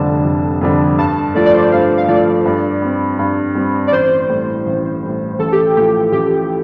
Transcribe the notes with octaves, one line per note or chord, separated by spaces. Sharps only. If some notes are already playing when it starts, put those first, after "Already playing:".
Already playing: F1 F2 D3 G3 D4 A5
F1
F2 D3 G3 D4
G2 A5
F3 A3 D5
D5
C5
G2 F5
F5
F3 A3 D5
G2
G3 C4
G2
G3 C4
D5
A1 C5
A2 G3
A1
A2 G3
A1 A4
G4
A2 F3 G4
A1 G4